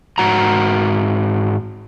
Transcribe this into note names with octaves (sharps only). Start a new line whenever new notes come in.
G#2 F#4 A#5